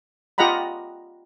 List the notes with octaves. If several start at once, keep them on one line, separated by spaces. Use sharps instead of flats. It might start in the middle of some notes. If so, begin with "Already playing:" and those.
F4 G4 D#5 F#5 A#5 B5